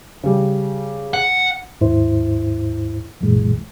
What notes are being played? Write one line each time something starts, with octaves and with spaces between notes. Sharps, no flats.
C#3 G3
F#5
D#2 G#2 E4 C5
C2 F#2 A#2 E3 G#3